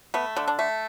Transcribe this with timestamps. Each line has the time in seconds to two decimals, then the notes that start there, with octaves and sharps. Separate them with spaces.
0.14 A3 B3
0.37 D3
0.48 D4
0.59 A3